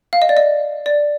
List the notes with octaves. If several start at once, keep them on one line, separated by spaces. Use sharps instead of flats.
F5
D#5
D5
D#5
D5